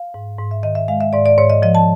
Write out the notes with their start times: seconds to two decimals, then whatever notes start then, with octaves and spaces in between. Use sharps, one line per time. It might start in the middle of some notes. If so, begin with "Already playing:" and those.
Already playing: F5
0.14 G#2
0.38 G#2
0.51 E5
0.63 D#3 D#5
0.75 E5
0.88 G#3 F5
1.01 E5
1.13 G#2 D5
1.26 D5
1.37 G#2 C#5
1.50 D#5
1.62 F3 D#5
1.75 A5